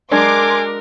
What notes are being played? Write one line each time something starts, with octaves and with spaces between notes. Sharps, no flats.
F#3 G#3 D4 A#4 G#5 C6 D6